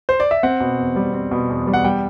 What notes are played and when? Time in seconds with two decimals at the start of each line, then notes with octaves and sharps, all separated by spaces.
0.09 C5
0.20 D5
0.31 E5
0.43 C4 F#5
0.61 B2
0.79 E2
0.96 G3
1.14 C4
1.31 B2
1.49 E2
1.67 G3
1.73 F#5
1.85 G3 G5